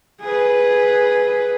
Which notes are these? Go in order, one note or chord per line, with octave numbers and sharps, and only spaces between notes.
G#4 B4